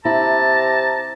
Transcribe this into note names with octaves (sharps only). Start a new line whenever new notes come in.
C3 E4 A5 A#5